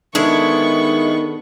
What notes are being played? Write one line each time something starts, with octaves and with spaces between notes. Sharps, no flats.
D#3 G#3 B3 D4 E4 A4 C#6